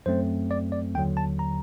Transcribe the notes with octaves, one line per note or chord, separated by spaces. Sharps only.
F#2 F#3 A3 C4 C5
D5
D5
D#2 D3 F#3 G5
A5
A#5